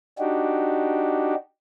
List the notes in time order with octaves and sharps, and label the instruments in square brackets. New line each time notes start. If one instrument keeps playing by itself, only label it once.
[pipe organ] D4 D#4 F#4 G4